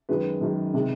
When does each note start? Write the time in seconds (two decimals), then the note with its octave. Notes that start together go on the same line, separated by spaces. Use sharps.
0.09 F#2 D#3 G#3 B4
0.41 F#2 D#3 G#3
0.74 C3 D#3 G#3